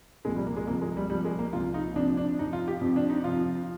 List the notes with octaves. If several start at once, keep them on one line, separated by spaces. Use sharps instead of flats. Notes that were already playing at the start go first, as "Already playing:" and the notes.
C2 A#2 F3 G#3
G3
A#3
G#3
C2 A#2 F3 A#3
G#3
G3
C2 A#2 F3 G3
G#3
A#3
C2 A#2 F3 F4
D#4
F2 C3 F3 D4
D4
F2 C3 F3 D#4
F4
G4
F2 C3 F3
D4
D#4
F2 C3 F3 F4